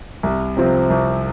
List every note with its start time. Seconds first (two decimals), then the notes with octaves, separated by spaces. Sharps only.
0.23 C2
0.57 C3 F3 C4
0.90 C2